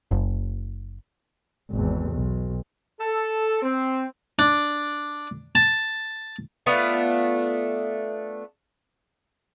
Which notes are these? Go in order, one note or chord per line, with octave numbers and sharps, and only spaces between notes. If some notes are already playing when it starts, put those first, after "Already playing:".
F#1
G#1 E2
B1
A4
C4
D4
A5
A3 B3 D4 F4